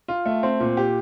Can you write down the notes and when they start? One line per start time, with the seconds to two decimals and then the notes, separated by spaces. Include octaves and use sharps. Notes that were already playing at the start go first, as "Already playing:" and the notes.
0.08 F4
0.25 A3
0.43 C4
0.60 A#2
0.77 G4